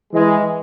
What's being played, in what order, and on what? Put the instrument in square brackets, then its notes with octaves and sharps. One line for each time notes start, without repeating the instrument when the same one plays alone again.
[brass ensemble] E3 G#3